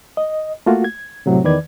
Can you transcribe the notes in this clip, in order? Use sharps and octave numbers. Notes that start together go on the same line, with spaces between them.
D#5
A3 A#3 F4 F#4
G#6
A2 C3 F#3
E2 D#3 B4 D5 G#6